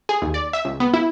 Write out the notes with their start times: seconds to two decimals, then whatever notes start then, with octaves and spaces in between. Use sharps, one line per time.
0.09 G#4
0.22 D#2
0.34 D5
0.53 E5
0.65 C#2
0.80 B3
0.94 E4